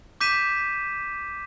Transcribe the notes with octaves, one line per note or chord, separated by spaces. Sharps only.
D6 G6 B6 D#7 E7